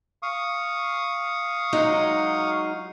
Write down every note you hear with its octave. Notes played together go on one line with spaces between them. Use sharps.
F5 C#6 D#6
F#3 G#3 D#4